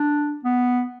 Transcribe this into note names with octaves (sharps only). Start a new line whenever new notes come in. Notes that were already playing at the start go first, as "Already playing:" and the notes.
Already playing: D4
B3